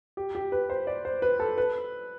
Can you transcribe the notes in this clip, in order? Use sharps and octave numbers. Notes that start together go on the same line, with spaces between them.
G4
G4
B4
C5
D5
C5
B4
A4
B4